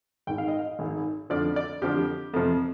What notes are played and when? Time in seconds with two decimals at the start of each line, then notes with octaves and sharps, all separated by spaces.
0.27 G#1 G#2 D#3 G5
0.38 F5
0.48 D#5
0.59 F5
0.79 G#1 G#2 D#3
1.30 F2 D3 F3 D5
1.56 D5
1.82 F2 D3 F3 G4
2.34 F2 C3 F3